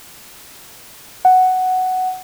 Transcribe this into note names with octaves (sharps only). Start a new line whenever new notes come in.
F#5